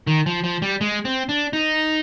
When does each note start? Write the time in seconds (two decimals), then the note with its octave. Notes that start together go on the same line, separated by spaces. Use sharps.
0.07 D#3
0.26 F3
0.44 F3
0.62 G3
0.81 G#3
1.05 C4
1.29 D4
1.53 D#4